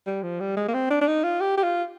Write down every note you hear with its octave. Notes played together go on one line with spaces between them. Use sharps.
G3
F3
G3
G#3
A#3
C4
D4
D4
D#4
F4
G4
G4
F4